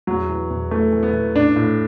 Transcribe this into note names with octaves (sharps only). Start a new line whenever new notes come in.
E2 F#3
E3
E2
E3 A3
E3
B3
E3
A2 D4
A2